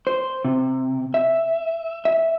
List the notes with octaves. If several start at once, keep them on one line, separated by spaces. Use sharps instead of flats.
C5
C3
E5
E5